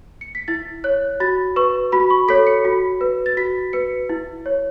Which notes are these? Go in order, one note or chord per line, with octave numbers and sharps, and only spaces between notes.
C#7
B6
E4 A6
C#5 F#6
F#4 A6
B4 C#6
F#4 B5
C#6
A4 C#5 B6
C#7
F#4
B4
A6
F#4 B6
B4 C#7
E4
C#5